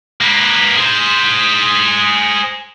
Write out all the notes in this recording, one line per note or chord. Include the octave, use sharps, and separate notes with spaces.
A#3 B4
G#4 C5